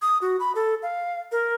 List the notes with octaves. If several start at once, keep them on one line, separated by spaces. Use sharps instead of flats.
D#6
F#4
B5
A4
F5
A#4